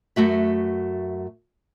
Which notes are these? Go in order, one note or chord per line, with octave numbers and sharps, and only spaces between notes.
F#2 A3 F#4 E5